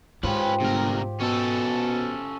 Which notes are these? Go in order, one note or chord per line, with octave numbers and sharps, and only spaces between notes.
G#2 F3 C#4 G4 B4
G1 C3 A#4
B2 C#4 A4